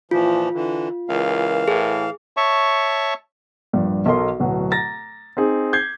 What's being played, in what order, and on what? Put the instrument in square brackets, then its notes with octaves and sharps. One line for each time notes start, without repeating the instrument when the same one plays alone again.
[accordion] A#2 E3 F3 [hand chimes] F4
[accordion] D3 E3
[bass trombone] C#2 [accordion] E3 F5 [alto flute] A#4
[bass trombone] A2 [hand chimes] G#4
[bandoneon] C#5 E5 A5 C#6
[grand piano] A#1 G2
B1 A4 A#4 D#5 C6
D1 B2 F#3
A#5 A6 A#6
C4 D#4 G#4
G6 G#6 C7